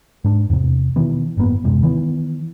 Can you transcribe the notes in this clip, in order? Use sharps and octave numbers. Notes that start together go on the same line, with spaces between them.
G#2 D4
E2 C3
B2 D#3 E3 B3
F#1 G#2 A#3 B3
D#1 F#2 C3 G#3
D#3 E3 B3